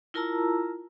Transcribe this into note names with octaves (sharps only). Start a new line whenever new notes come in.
E4 F4 A#4 A5 A#5 E6